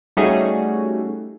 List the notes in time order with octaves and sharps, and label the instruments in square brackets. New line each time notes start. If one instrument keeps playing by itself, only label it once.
[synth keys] G3 A3 C#4 D#4 F#4 G#4